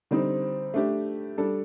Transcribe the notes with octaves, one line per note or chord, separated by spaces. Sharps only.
D3 G3 C4 D#4
A3 D4 G4
G3 D4 A4